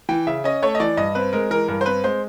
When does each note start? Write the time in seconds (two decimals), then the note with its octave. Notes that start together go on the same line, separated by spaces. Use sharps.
0.09 E3 G5
0.27 C#3 E5
0.44 C#4 D#5
0.63 A3 C#5
0.75 D#5
0.80 E3 D5
0.97 G2 D#5
1.15 C4 B4
1.33 G#3 A#4
1.50 E3 A#4
1.68 G2 A#4
1.81 C5
1.86 C4 B4
2.04 G#3 C5